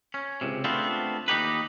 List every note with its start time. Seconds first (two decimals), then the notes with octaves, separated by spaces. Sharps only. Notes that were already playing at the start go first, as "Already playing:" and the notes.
0.14 C#4
0.41 C#2 C3
0.64 A3 B3 C4 D4 F4
1.28 D#2 D#4 G4 B4